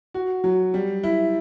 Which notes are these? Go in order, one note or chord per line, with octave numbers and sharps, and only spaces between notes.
F#4
F#3
G3
E4